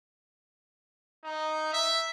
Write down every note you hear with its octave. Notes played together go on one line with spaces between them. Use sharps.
D#4
E5